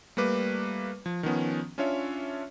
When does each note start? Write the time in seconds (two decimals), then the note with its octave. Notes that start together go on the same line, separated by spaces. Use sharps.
0.17 G3 A3 A#3 B4 D6
1.06 F3
1.23 D#3 F3 B3 C#4
1.78 C#4 D4 F4 C#5 E5